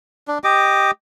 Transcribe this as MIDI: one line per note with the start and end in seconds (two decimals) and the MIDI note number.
0.28 0.38 62
0.44 0.91 67
0.44 0.91 75
0.44 0.91 86